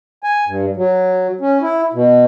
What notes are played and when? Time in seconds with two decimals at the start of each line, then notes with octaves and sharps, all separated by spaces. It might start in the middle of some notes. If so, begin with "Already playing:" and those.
0.24 G#5
0.47 G2
0.76 F#3
1.41 C#4
1.62 E4
1.94 B2